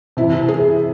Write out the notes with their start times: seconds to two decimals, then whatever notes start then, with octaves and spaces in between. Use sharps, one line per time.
0.17 C3 E3 E4
0.48 G#4